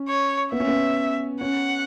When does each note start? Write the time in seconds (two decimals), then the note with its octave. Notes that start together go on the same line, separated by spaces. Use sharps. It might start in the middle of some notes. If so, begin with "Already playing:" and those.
Already playing: C#4
0.09 C#5
0.52 B3 E5
0.60 C#4
0.67 B3
1.41 C#4 F#5